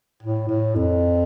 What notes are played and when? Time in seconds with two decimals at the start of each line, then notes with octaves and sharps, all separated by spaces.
0.23 A2
0.49 A2
0.76 F2